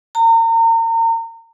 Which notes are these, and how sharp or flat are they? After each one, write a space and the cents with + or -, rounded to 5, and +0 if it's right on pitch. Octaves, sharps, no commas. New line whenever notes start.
A#5 -35